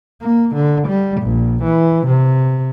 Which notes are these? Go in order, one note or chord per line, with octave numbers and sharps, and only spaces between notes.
A#3
D3
G3
A#1
E3
C3